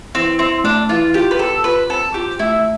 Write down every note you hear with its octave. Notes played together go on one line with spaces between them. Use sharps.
E3 C4
C4 E4
A3 D4
E3 F4
F4 G4
B4
B3 A4
F4 B4
C4 A4
F4 G4
A3 E4